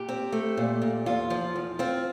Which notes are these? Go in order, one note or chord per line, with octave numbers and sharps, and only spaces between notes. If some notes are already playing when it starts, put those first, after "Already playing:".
Already playing: A#2 G4
C4
A3
A#2
A#2
E2 F4
F3
E2
C4 F4